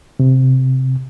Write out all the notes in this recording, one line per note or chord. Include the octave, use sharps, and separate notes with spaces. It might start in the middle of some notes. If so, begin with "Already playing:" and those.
C3